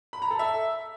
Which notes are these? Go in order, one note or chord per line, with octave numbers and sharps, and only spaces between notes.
B5
A#5
A4
E5